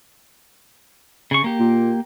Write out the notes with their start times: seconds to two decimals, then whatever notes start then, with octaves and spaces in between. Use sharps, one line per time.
1.31 C#3 C#6
1.44 A#3 G4
1.59 A#2